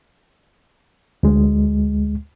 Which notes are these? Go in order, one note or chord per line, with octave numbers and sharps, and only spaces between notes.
D2 G#3